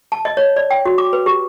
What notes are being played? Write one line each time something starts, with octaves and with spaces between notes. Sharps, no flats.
A5
D#5
C#5
D5
G5
F#4
D6
B4
G4